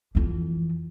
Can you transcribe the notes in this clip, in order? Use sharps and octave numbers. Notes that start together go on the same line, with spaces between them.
F2 E3